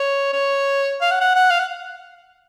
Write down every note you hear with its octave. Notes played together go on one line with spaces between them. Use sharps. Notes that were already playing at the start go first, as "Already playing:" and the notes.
Already playing: C#5
C#5
F5
F#5
F#5
F#5
F5
F#5